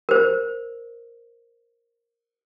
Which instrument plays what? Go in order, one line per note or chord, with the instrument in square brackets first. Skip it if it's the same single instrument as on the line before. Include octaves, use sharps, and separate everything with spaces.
[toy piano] A#4 C5